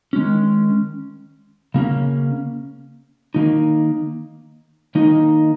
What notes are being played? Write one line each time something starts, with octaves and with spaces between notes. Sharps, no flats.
D#3 G#3 C#4
C#3 A#3 C#4
D#3 A#3 D#4
D#3 A#3 D#4